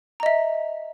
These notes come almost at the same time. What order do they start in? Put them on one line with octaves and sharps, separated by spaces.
A#5 D#5 E5